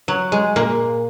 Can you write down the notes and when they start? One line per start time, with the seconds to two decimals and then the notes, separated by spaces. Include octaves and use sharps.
0.08 F#3
0.32 G#3
0.56 A#2 A#3